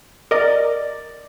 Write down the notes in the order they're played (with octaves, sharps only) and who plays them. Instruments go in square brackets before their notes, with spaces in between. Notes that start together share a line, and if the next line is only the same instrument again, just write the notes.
[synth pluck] A#4 D#5 [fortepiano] D5